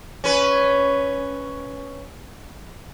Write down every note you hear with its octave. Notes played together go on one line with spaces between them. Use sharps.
C#4 B4